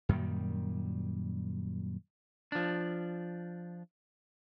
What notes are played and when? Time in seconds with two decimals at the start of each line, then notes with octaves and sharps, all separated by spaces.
0.09 F#2 A#2 D#3 G3
2.52 F3 D4